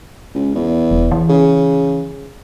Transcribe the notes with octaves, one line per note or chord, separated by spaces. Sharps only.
C#2
E2
E1
E3
C#3